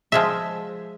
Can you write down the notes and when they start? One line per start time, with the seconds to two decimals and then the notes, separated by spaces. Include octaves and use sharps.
0.12 F3 G#3 E5